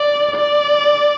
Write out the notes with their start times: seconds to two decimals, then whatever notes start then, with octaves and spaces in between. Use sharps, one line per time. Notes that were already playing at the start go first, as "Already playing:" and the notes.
Already playing: D5
0.36 D5